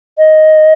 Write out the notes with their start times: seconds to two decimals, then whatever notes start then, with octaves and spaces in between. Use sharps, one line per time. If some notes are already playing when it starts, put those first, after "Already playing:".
0.18 D#5